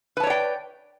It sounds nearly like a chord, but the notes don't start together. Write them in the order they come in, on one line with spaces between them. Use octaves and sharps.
B4 A5 C#5 D5 G5